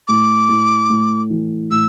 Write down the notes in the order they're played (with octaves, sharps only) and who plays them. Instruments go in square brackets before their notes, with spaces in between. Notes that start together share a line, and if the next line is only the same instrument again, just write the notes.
[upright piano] A2 [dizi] D6
[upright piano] A2
A2
E3
[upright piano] A2 [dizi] E6